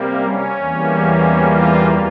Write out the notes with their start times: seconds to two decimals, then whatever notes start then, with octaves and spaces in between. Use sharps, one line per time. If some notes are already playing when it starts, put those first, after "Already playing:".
Already playing: C3 G3 A#3
0.18 C#4
0.59 E2 E3 G3 A#3
1.42 F4